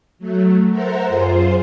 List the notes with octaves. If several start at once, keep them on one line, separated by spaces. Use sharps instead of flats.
F#3 A3
A4 A#4 C5 E5 F#5 A#5
F#2 F4 G#4 C5 C6